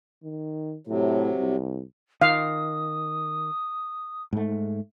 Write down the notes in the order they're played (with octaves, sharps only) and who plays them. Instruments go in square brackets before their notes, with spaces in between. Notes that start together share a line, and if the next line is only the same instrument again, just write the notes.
[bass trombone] D#3
[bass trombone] A2 [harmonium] C3 F#3
[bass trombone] C2
[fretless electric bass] D#3 [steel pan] F5 [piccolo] D#6
[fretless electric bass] G#2 A3